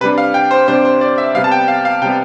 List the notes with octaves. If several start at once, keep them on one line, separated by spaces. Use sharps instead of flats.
C3 G3 D4 B4
F5
G5
C5
C3 G3 D4 C5
C5
D5
E5
C3 G3 B3 F5
A5
G5
F5
F5
C3 G3 B3 G5